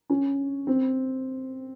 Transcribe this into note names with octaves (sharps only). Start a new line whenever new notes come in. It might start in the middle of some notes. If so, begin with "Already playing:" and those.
C#4
C4